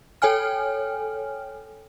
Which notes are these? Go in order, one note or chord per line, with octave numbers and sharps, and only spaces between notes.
A4 C#5 G5 G#5 F6